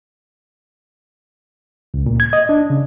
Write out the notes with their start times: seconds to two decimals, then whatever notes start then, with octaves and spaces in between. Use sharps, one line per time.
1.94 C#2
2.06 A#2
2.20 G#6
2.33 D#5
2.49 D4
2.70 C#3